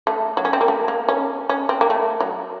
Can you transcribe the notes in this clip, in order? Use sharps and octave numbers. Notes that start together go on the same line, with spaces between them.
A3
F#3
C#4
C4
A#3
A3
A#3
C#4
C#4
C4
A#3
A3
F#3